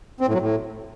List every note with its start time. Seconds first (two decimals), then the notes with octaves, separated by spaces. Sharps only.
0.21 C4
0.27 A2
0.34 F#3
0.41 A2